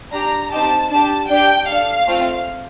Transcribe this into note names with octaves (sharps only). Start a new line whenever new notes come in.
D4 G4 A#5
C4 D#4 G4 A5
D4 G4 A5
D4 G4 G5
D4 A4 F5
A3 C4 F4